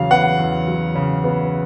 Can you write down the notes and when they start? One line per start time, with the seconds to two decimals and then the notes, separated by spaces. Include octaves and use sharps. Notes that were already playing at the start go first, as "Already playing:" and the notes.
Already playing: E2 C#3 F#3 F5
0.11 B3 F#5
0.39 E2
0.68 F#3
0.96 C#3
1.24 B3